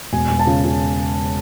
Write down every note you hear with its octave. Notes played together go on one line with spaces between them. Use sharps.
E1 G#5
E1 G#5
A5
C#3
C#3